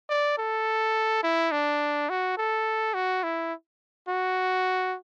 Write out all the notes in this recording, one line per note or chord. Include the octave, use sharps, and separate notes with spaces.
D5
A4
E4
D4
F#4
A4
F#4
E4
F#4